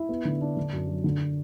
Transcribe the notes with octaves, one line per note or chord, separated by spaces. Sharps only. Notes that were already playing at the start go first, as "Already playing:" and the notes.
Already playing: E4
B3
D3
D4
D3
F#2
F#3
D3